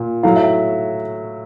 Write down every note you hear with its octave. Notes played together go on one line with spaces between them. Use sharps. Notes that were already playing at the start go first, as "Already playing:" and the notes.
Already playing: A#2
A2 F#3 F5
E5